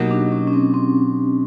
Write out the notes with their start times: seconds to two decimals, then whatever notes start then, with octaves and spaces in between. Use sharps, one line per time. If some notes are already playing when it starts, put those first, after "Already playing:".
Already playing: B2 F#3 A#3 D#4 F#4 G4
0.11 D4
0.32 C#4
0.47 C#4
0.53 C4
0.74 C4